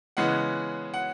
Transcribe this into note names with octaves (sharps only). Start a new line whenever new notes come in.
C#3 E3 G#3 B3 F#5
F#5